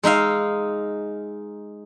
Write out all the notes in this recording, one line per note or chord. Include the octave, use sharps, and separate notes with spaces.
G#3 D#4 E5 F5